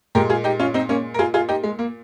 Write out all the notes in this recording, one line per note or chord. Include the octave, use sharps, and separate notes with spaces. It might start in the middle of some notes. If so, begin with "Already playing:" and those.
A#2 G#3 G4 A#4
F4 G#4
D#4 G4
C#4 F4
C4 D#4
A#3 C#4
A#4
F4 G#4
F4 G#4
D#4 G4
G#3
A#3